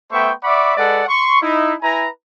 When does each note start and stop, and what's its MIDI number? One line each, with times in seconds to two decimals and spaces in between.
0.12 0.32 57
0.12 0.32 59
0.12 0.32 72
0.12 0.32 76
0.12 0.32 79
0.12 0.32 85
0.43 0.74 74
0.43 0.74 76
0.43 0.74 78
0.43 0.74 83
0.43 0.74 85
0.43 0.74 86
0.77 1.02 56
0.77 1.02 69
0.77 1.02 71
0.77 1.02 74
0.77 1.02 78
1.07 1.37 84
1.07 1.37 85
1.41 1.73 63
1.41 1.73 64
1.82 2.08 64
1.82 2.08 71
1.82 2.08 80
1.82 2.08 82